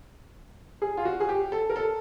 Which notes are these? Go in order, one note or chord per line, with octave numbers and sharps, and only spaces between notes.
G#4
F4
F#4
G#4
G4
A4
A#4
A4